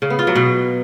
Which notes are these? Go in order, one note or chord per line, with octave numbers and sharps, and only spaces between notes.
C#3
B3
F4
F#3
B2